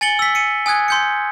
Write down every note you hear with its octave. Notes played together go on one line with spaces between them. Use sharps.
G#5 A6 C#7 F#7 G7
E6 B6
C#7 D#7
G#5 D#6 F#6 G#6
C6 G6 C#7